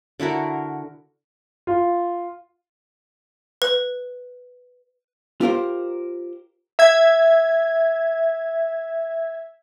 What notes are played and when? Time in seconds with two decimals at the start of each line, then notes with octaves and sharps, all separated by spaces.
0.20 D3 E4 F#4 A#4
1.67 F4
3.62 B4
5.41 F4 G4 A#4 C5
6.79 E5 G#6